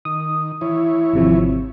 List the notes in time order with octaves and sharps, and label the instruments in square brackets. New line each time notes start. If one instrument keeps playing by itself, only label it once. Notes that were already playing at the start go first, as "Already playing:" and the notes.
[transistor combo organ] D#3 [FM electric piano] D#6
[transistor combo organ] E3 E4 C#5
[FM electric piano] G#1 C3 F3